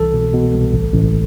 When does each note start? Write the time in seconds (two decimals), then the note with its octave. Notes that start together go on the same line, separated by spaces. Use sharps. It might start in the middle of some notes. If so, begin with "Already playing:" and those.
Already playing: C2 E3 A4
0.13 B2
0.34 B2
0.54 C2
0.74 A1
0.94 A1